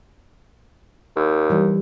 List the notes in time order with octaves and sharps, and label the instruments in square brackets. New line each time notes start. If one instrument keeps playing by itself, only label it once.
[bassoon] D#2
[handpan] E3 G3